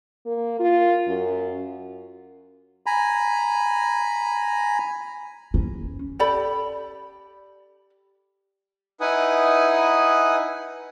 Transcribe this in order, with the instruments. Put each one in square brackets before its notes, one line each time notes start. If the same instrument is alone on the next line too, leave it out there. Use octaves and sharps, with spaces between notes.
[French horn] A#3
F4
F#2
[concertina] G#5 A#5 B5
[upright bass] C#4
[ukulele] G4 A4 D5 B5
[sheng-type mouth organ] D#4 E4 B4 F#5 G#5 D#6